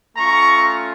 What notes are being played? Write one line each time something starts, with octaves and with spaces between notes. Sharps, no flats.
A3 C#4 F4 A#5 C#6